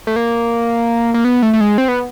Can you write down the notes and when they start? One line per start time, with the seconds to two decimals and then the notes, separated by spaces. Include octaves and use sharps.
0.07 A3
0.16 A#3
1.14 A#3
1.25 B3
1.42 A3
1.53 A3
1.61 G#3
1.78 C4
1.88 B3